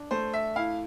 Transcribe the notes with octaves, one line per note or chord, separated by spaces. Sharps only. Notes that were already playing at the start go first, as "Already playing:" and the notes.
Already playing: D4
A3 C5
E5
E4 F5